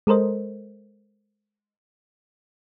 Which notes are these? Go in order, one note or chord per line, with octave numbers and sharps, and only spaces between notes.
G#3 A4 A#4 C5 D#5